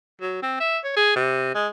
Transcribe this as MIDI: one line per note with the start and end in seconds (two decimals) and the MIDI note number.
0.21 0.39 54
0.43 0.60 60
0.60 0.78 76
0.84 0.95 73
0.96 1.16 68
1.16 1.50 48
1.55 1.68 56